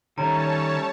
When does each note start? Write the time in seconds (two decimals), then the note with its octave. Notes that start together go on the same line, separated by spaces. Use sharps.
0.18 D#3 G3 A3 C#4 C#5 A5 A#5